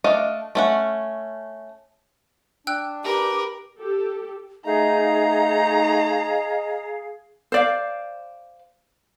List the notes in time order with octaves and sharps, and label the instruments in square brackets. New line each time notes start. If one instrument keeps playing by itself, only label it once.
[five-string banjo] A3 D4 D#5 F5
A3 C#4 F#5
[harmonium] D4 [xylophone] G5 E6 F#6
[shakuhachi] G4 [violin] A#4 B4
[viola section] G4 A4
[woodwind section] A3 D#4 [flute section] G#4 F5 [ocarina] D#5 [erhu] A#5
[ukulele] C5 D5 F5